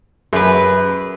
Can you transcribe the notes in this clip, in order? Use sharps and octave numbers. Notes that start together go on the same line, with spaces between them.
F#2 G#4 B4